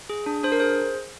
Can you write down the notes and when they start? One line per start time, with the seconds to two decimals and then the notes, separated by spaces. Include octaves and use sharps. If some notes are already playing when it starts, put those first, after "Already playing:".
0.09 G#4
0.26 D4
0.43 D4 C5
0.52 A#4
0.60 G#4 C5